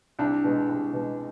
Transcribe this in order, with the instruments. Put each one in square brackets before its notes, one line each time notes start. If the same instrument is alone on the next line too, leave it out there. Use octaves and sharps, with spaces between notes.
[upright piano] C2 [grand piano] D4
[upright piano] B2 G#3
C2
B2 G#3